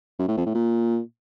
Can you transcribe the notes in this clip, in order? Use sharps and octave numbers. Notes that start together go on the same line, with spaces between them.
F#2
A2
F2
A2
A#2